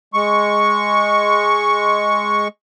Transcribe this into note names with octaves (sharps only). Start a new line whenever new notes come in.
G#3 C#6